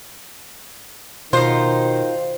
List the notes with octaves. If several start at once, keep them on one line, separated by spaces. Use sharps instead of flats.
B2 D#3 D#4 F4 C5